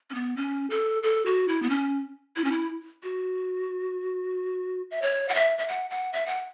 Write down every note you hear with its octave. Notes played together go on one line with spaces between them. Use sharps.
C#4
B3
C#4
A4
A4
F#4
E4
B3
C#4
E4
C#4
E4
F#4
E5
C#5
F#5
E5
E5
F#5
F#5
E5
F#5